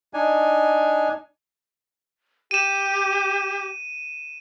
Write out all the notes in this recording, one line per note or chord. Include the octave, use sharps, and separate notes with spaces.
D4 D#4 G#5
G4 D#7 E7